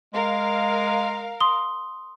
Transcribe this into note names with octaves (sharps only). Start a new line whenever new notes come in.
G#3 A#4 F5
C6 D#6 G7